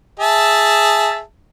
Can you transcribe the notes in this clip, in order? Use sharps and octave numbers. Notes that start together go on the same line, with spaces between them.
G#4 E5 A5